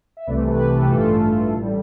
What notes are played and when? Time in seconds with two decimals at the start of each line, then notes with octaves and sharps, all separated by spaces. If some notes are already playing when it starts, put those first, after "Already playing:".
0.17 E5
0.27 C2 C3 E3 A3 B4 D5
0.48 G4 B4
0.69 A4
0.79 G4
0.89 A1 G2 E3 A3 F4 A4
1.53 A1 A2 G3